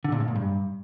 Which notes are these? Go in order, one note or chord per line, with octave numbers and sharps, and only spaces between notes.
D3
A#2
A2
A#2
G2